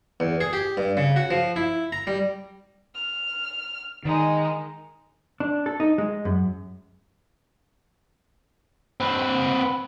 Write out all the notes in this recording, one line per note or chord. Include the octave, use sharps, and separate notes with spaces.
E2
G#4
G4
G2
C#3
F#4
F3
E4
A#5
G3
F6
D#3 G#3 D#4
D4
A4
D#4
G#3
F#2
C4 B4